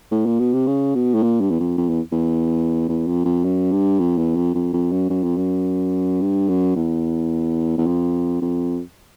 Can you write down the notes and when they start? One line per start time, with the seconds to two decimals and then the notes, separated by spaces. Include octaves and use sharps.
0.11 A2
0.26 A#2
0.39 B2
0.53 C3
0.67 C#3
0.95 B2
1.14 A2
1.22 A#2
1.41 G2
1.50 E2
1.60 F2
1.78 F2
1.89 E2
2.12 E2
2.89 E2
3.07 F2
3.25 F2
3.44 F#2
3.71 G2
3.99 F2
4.18 E2
4.36 F2
4.54 F2
4.73 F2
4.91 F#2
5.10 F#2
5.23 F2
5.37 F#2
6.21 G2
6.48 F#2
6.76 E2
7.78 E2
7.86 F2
8.41 F2